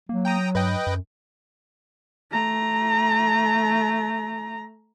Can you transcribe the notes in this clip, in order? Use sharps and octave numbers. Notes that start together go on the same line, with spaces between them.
F#3 A#3
G5 A#5 D#6
G2 B4 D#5 G5
F#2
A3 A#5